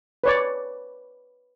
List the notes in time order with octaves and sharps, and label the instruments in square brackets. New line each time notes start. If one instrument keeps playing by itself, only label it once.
[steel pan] B4 C#5 D5